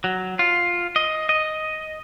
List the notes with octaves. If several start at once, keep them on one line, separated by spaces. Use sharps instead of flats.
F#3
F4
D#5
D#5